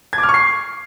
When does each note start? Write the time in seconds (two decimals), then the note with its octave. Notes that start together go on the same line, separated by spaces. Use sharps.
0.13 G#6
0.18 D6
0.23 F6
0.29 C#6
0.34 C7